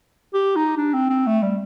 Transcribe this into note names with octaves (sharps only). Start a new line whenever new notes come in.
G4
D#4
D4
C4
C4
A3
G3